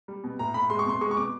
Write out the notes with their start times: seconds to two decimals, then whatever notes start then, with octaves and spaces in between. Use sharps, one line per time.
0.08 G3
0.24 B2
0.39 A2 A#5
0.54 A2 B5
0.70 G#3 C6
0.79 C#6
0.86 B2 C6
1.01 G#3 C#6
1.11 C#6
1.17 B2 D6